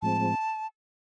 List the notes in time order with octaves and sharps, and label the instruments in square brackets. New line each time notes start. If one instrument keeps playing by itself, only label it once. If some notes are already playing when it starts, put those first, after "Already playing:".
[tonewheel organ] A2 F3 G#3 C4 [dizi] A5